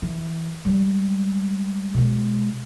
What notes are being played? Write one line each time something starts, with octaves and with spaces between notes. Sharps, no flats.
E3
G3 G#3
B2 G#3